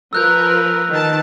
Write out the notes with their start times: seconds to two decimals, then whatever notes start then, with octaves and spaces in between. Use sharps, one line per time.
0.13 F3 A#4 B4 E6 F#6 G6
0.91 D#3 B4 A5